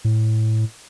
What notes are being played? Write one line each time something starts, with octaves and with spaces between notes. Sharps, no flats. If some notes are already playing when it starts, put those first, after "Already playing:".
A2